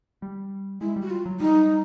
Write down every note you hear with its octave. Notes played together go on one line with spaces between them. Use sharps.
G3
G#3 E4
G3
F#4
F4
F#3
G3 D#4